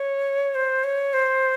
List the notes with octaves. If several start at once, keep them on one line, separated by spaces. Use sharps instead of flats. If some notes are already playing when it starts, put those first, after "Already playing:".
Already playing: C#5
C5
C#5
C5